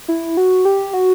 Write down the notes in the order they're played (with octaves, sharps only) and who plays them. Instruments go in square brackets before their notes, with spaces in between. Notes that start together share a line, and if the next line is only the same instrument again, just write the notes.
[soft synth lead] E4
F#4
G4
F#4